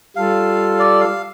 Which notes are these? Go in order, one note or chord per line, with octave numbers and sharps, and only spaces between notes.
G3 F4 A4 F5
D5
F5